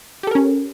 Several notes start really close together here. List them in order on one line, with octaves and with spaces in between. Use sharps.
G4 A4 A#4 C#4